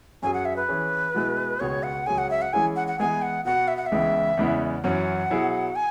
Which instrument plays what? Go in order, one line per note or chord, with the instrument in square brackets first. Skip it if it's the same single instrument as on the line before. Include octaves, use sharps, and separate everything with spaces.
[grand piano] F#2 F#3 C#4 G#4 [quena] G#5
[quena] F#5
E5
B4
[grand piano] E3 C#4 G#4
B2 G#3 E4
[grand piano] C#2 B2 B3 G#4 [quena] C#5
[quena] F#5
[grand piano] C#2 C#3 F#3 C#4 G#4 [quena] G#5
[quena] F#5
E5
F#5
[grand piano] E3 G#3 C#4 E4 G#4 [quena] G#5
[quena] F#5
F#5
[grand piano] E3 G#3 B3 G#4 [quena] G#5
[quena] F#5
[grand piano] B2 B3 F#4 [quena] F#5
[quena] E5
F#5
E5
[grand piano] C#2 C#3 E3 G#3 B3
E2 C#3 G#3 B3 E4
[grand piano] F#2 E3 C#4 [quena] F#5
[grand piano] B2 F#3 E4 G#4
[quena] G#5